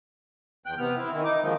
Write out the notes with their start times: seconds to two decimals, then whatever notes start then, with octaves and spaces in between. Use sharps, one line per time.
0.66 E2 G5 F#6
0.78 C3 B3 F6
0.97 C4 E4
1.12 D#3 E3 E4
1.24 D#4 D6
1.43 D3 D#3 F3 G#3 A#3